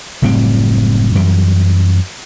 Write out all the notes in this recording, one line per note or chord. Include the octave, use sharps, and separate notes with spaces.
F#1 A2 G3 C4
F#2 E3 G3